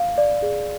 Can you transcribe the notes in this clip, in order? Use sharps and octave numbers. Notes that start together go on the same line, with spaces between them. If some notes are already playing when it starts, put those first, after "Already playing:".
Already playing: F5
D5
G#4